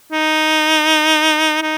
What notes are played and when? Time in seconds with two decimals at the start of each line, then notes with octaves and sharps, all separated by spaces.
0.12 D#4
1.63 D#4